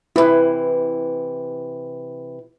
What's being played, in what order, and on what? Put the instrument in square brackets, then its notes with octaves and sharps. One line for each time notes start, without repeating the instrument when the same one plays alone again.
[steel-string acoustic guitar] C3 E3 [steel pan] E4 B4